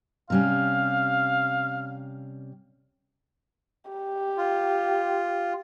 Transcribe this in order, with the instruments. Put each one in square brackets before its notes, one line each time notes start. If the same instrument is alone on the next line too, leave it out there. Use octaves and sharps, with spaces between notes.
[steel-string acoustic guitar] C3 G3 C#4 [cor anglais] F5
[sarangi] G4
[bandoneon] F4